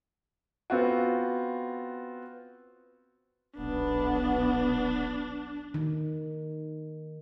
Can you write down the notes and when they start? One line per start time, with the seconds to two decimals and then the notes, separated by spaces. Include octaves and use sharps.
0.70 B3 C4 F4 F#4
3.57 D#1 B1 B3 D4
5.74 D#3